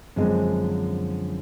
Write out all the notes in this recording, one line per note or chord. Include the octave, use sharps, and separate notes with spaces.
F#2 D3 F3 G#3 C4